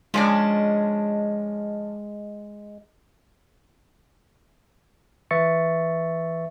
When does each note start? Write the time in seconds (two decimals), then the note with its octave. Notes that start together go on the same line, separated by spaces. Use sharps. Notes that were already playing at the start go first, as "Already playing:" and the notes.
0.14 F3 G#3 C#4 D4
5.31 E3 B4 E5 C#6 A6 C#7